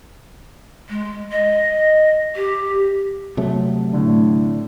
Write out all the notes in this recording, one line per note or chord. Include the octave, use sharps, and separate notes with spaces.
G#3
D#5
G4
C3 F#3 A3
A2 D3